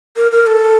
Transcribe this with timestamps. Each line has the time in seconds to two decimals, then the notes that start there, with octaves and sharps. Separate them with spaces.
0.16 A#4
0.31 A#4
0.47 A4